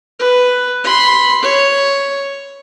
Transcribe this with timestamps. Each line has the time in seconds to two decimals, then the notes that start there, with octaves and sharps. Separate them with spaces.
0.19 B4
0.84 B5 C6
1.42 C#5